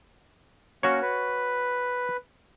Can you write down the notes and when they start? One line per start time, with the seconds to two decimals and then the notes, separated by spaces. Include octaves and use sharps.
0.83 A#3 C#4 F#4 A#4 C#5
1.02 B4